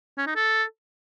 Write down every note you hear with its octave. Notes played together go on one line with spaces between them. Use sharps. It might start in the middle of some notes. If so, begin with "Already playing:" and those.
C#4
D#4
A4